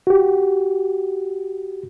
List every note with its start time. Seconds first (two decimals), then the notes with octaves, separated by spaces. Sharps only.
0.07 F#4 G4